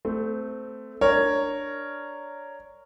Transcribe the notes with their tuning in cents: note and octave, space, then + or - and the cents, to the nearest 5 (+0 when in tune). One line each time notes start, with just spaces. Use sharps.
A3 +0 C4 -20
D4 +0 A#4 -10 C#5 +0